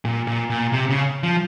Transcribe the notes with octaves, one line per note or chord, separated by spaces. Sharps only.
A#2
A#2
A#2
C3
C#3
F3